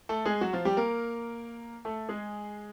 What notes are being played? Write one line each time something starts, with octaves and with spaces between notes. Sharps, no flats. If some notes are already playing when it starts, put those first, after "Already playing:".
A3 A4
G#3 G#4
F#3 F#4
F3 F4
G3 G4
A#3 A#4
A3 A4
G#3 G#4